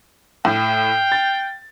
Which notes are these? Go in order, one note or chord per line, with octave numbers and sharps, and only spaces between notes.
A2 F5 G5
A6